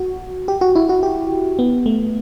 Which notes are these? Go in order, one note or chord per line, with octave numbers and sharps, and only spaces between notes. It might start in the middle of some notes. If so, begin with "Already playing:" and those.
Already playing: F#4
G4
F#4
E4
F#4
G4
B3
A3